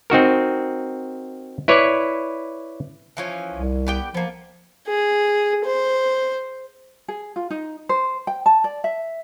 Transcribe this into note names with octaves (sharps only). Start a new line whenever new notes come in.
C4 D#4 F#4 A#4
E4 B4 C#5 D5
E3 F3 C#4
C2
B3 G4 G5
F3 A#3 B3
G#4
C5
G#4
F4
D#4
C5
G5
A5
D5
E5